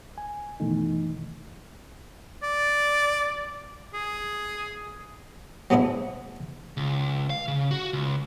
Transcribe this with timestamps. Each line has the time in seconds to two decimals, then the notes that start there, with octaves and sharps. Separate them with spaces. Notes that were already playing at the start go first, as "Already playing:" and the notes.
0.18 G#5
0.60 F#2 B2 D#3 E3 A3 D#4
2.43 D5
3.94 G#4
5.70 F#3 G#3 B3 D4 E4
6.77 C#2
7.30 F5
7.48 C#3
7.71 F#4
7.93 C#2